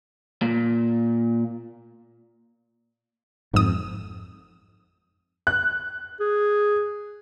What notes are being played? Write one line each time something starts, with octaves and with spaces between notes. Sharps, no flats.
A#2
G#1 F2 D#6
F#6
G#4